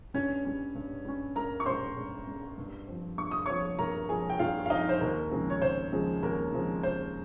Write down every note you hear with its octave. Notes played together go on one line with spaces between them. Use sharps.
G2 C#4 C#5
G3 C#4
G2
G3 C#4
G2 A#4 A#5
C#6
G3 C#4 C5 C6
G2
G3 C#4
G2
F3 C4
G2 C#6
D#6
F3 C4 C#5 C#6
G2 A#4 A#5
F3 C4 G#4 G#5
G5
G2 F4 F5
F5
F3 C4 D#4 D#5
C5
D#2 A#4
C#3 F3 G#3 C4
C#5
D#2 C5
C#3 F3 G#3 C4
D#2 A#4
C#3 F3 G#3 C4
D#2 C5